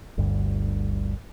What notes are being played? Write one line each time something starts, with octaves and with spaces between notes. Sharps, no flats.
G1 D2 G2